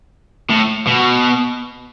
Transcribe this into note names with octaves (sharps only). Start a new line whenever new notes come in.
A2
B2